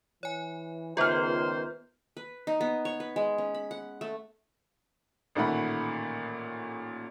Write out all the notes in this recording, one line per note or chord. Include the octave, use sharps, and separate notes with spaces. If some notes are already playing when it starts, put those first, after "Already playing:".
E3 C#5 G#5
C#2 D#3 B3 F4 B4 C5 F6
B4
D#4
B3
C#5
B4
G#3
C#4
B5
F#5
A3
A1 A#2 D#3 A3 F#5 B5